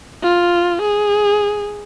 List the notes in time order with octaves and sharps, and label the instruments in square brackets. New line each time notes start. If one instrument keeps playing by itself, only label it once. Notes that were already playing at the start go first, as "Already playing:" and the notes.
[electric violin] F4
G#4